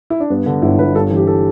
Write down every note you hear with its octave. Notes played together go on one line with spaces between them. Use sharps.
E4
D4
G2 B3
D3
G1 E4
G1 B4
G2 A4
E3
G4
A4